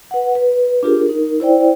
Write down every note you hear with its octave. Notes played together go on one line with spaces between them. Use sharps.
B4 F#5
B4
D4 F4 G4 G#4 A#4
D#4 A#4
E4 C5 D5 G5